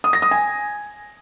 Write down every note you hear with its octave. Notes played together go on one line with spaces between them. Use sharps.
D#6
A#6
D#6
G#5